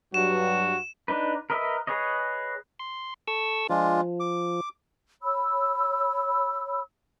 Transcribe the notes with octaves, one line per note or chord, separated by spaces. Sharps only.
G2 F#3 F#4 E7
D4 D#4 B4
A#4 B4 D#5 E5
G#4 B4 C#5 D#5
C6
A4 C#6 E6
F3 G#3 D4 F4
D6
C#5 B5 E6